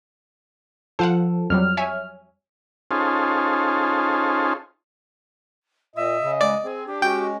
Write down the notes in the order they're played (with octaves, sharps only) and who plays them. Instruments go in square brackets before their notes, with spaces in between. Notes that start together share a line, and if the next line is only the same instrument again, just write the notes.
[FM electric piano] F3 A4 [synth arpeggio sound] C5 F5 F#5
[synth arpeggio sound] F2 F#3 G3 [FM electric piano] F6
[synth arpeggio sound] C#5 E5 G#5
[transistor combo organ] C#4 D#4 F4 G#4 A4 C5
[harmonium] A#2 [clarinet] D#5 [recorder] E5
[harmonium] C#3
[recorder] G#3 [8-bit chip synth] D5
[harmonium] C4 [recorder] G#4
[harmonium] D4 [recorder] G4
[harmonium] G#3 C#4 [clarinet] F#4 [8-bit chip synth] G5